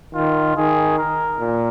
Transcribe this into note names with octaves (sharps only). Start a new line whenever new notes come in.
D#3 F4
D#3 G#4
A#4
A#2